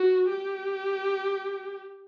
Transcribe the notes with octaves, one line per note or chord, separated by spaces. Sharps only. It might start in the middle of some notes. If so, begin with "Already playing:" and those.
Already playing: F#4
G4